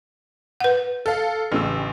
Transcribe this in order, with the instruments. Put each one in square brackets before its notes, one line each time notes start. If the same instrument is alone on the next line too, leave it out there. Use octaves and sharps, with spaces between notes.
[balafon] B4 F#5
[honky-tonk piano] A4 F5
A1 C#3 E6